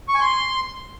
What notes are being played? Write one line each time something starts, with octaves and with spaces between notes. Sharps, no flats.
C#6
G#5
C6